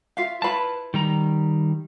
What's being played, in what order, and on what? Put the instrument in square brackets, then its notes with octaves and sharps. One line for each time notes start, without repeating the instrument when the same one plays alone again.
[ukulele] F4 E5 F5
[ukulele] E4 F4 B5 [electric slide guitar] B4 A5
[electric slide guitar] D#3 G3 A#5